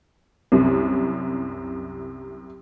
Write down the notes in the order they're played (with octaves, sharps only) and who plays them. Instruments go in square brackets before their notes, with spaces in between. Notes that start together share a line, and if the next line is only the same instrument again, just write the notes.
[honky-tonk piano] C2 F#2 C3